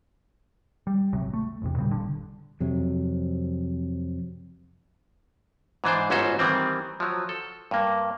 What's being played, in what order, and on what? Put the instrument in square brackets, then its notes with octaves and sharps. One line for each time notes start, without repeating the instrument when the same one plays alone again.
[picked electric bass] G3
G#1 D2 C3 F#3
A3
A1 E2 C3
A#2 C#3 F#3 G3
G1 G2 D3
[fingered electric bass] F2 C3 F#3
[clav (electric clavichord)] G#2 E3 D4 C5
G1 G#2 C#4 F#4 A4 C5
D#3 E3 G3 C4
F3 F#3
A4
G2 A#3